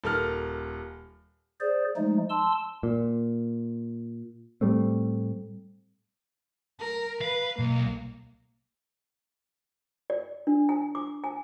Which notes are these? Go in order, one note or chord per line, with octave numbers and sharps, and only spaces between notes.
D#1 A4 A#4 F6
G#4 C5 D5
F3 G#3 A3 D#4
A5 C6 E6
A#2
A2 G3 A3 C4
A#4
B4 F5
B1 A#3
D5
D4
G#5
D6
G#5